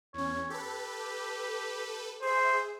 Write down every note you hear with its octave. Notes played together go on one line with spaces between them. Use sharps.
E2 C#4 C#5
G4 A4 B4
G#4 C5 E5